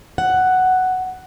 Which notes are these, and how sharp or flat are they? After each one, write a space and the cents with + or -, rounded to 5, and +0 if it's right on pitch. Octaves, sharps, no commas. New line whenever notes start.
F#5 +5